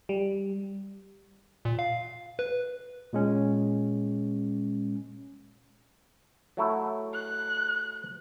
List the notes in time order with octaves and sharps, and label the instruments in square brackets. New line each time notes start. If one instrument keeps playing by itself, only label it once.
[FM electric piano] G3
[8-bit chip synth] A#2
F5
B4
[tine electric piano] A#2 G#3 C#4
[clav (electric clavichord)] F#3 A3 E4
[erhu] F#6